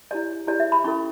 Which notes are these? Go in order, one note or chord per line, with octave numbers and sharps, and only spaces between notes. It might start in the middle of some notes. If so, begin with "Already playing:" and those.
E4 G4 C#5 D5
E4 G4 C#5 D5
E5
B5
C#4 E4 A4 C#6